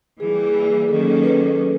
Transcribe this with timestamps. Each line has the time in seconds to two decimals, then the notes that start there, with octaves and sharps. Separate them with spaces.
0.20 E3 G3 A#3 G#4
0.88 D#3 F#3 A#3 C#4 A4
1.23 B4